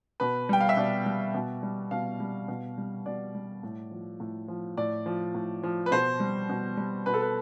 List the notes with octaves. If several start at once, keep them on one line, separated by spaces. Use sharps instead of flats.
B2 B4
G3 G5
F5
E5
B2 D5
G3
B2
G3
B2 F5
G3
B2
G3
B2 D5
G3
A2
F3
A2
F3
A2 D5
F3
A2
F3
B4
B2 C5
G3
B2
G3
B2 B4
A4
B4